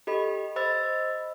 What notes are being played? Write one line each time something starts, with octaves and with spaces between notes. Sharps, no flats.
G4 A4 D#5 B5
C5 D#5 B5 E6 A6